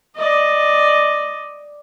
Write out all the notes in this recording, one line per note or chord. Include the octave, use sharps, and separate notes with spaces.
D5 D#5